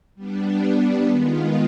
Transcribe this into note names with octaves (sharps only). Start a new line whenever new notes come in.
G3 B3 D4
D#3 G#3 B3 F4